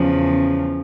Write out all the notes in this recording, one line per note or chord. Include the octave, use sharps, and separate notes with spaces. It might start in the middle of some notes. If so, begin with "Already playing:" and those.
Already playing: E2 C#3 F3